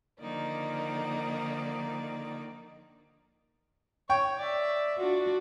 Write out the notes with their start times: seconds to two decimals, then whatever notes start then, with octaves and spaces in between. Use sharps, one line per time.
0.21 D3 D#3 F3 A#3 D#4 D5
4.10 C#5 G5 C#6
4.39 D5 E5
4.98 D4 F4 F#4